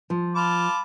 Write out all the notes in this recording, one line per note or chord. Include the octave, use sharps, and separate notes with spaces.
F3
F4 A5 B5 D6